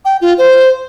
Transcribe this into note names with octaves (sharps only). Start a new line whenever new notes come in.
G5
F4
C5